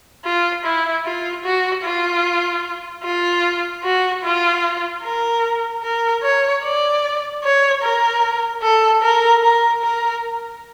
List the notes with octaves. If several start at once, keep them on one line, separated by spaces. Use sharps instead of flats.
F4
E4
F4
F#4
F4
F4
F#4
F4
A#4
A#4
C#5
D5
C#5
A#4
A4
A#4
A#4
A#4